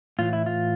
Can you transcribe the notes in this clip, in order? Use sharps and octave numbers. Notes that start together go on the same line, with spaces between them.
A2 E3 F4
E4
F4